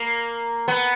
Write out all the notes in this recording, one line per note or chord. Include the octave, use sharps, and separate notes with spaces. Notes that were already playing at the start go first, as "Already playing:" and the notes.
Already playing: A#3
B3